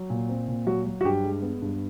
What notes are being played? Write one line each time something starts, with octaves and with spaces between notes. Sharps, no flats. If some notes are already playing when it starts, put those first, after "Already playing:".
Already playing: F#3
A#2
C4
A#2
F#3 F#4
F#3
F#4
G2 G4
G#3
B3
G2